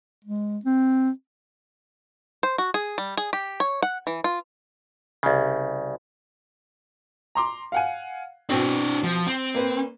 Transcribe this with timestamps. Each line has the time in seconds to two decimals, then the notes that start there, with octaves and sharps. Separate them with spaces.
0.25 G#3
0.65 C4
2.43 C5
2.58 F#4
2.74 G#4
2.98 G3
3.17 G#4
3.33 G4
3.60 C#5
3.82 F#5
4.07 E3
4.24 F4
5.23 C2 C#3
7.35 A#5 C6 D6
7.72 F5 F#5 G#5
8.49 B2 C4 D4 C#5
9.03 F3
9.27 C4
9.54 A#3 B4